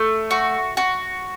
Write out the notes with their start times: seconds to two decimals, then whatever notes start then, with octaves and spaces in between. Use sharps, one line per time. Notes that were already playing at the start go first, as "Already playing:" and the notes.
Already playing: A3
0.31 F#4
0.77 F#4